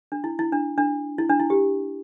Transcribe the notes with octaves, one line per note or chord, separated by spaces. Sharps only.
D4
E4
E4
D4
D4
E4
D4
E4
G4